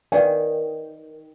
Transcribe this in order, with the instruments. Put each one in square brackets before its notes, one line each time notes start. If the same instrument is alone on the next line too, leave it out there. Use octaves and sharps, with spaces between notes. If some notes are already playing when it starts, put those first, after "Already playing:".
[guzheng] D#3 [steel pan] B4 D5 F5 G#5